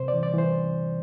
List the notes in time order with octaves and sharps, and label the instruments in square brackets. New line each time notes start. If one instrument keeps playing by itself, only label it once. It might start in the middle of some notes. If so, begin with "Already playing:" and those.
Already playing: [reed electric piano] C3 C5
D5
E3
D5
E3 C5